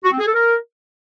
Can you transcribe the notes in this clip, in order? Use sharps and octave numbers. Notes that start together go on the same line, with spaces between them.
F#4
C4
G#4
A4
A#4